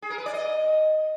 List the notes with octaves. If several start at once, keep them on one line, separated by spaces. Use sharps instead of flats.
G#4
A#4
B4
D5
D#5